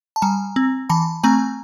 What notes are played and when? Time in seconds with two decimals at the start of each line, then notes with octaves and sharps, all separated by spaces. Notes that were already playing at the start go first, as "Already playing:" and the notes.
0.16 A5
0.22 G3 G#5 A#5
0.56 C4
0.89 E3 A5 B5
1.23 A3 C4 G#5 A#5